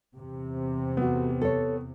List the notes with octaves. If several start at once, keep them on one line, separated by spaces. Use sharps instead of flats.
E2 C3
A3 B3 F#4
A4 C#5